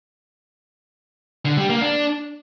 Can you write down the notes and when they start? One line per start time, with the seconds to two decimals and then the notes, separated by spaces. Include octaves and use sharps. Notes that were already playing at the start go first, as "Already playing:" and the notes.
1.46 D3
1.57 G3
1.69 A#3
1.81 D4